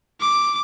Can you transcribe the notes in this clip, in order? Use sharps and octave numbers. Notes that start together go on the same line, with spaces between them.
D6